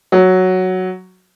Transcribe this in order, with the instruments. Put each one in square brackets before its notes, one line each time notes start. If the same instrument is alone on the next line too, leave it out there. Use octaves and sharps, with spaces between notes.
[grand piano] F#3